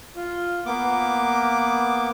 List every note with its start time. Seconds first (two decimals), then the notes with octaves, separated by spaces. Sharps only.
0.16 F4
0.66 A#3 B3 D6